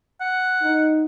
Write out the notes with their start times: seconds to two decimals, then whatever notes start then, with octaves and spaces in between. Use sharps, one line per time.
0.21 F#5
0.61 D#4